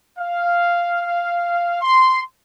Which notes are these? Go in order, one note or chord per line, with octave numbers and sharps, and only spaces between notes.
F5
C6